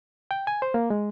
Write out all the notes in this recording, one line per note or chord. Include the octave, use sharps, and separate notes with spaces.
G5
G#5
C5
A#3
G#3